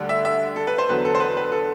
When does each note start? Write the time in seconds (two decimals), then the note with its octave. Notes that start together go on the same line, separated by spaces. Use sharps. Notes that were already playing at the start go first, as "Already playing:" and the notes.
Already playing: D2 D3 G3
0.09 E5
0.25 E5
0.56 A4
0.67 B4
0.78 C5
0.89 E2 D3 F#3 B4
1.05 A4
1.15 C5
1.20 B4
1.37 B4
1.52 A4